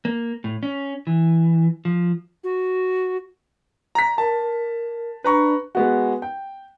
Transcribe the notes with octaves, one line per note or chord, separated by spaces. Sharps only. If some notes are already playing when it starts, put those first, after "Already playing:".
A#3
A2
C#4
E3
F3
F#4
A#5 B6
A#4 A5
D4 B4 A#5 C#6
G#3 B3 F#4
G5